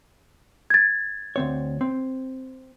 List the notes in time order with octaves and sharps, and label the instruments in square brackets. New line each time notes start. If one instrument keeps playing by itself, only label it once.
[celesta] G#6 A6
[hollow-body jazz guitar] D2 C4 C#5
C4